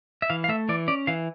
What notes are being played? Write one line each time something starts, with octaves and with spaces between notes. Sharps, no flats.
E5
E3 F5
F5
A3 E5
E3 D5
C#4 D5
E3 F5